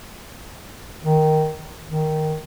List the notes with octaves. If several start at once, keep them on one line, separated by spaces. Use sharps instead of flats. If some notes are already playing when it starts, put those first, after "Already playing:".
D#3
D#3